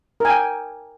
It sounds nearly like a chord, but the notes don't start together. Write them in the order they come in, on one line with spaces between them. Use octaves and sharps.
A#4 G#5 G5